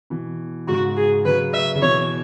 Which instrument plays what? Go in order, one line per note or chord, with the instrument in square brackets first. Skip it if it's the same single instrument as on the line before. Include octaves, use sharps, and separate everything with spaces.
[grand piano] B2 E3
[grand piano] G#2 C#3 [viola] F#4
[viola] G#4
[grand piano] C#3 F#3 [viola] B4
[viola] E5
[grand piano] C#3
[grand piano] B2 E3 [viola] C#5